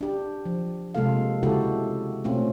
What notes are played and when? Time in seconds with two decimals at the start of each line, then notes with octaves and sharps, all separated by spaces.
0.01 D4 G4
0.46 F3
0.95 C3 G#3 A#3 F4 A4 F5
1.43 C#3 G#3 E4 F#4 G4 A4
2.24 B2 A3 C4 C#4 F4